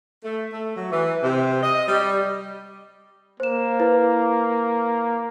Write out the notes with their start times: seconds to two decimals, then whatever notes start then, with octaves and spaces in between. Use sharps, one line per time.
0.24 A3
0.52 A3
0.76 F#3
0.90 E3
1.23 C3
1.63 D#5
1.87 G3
3.40 A#3 C5 E7
3.80 E4 B4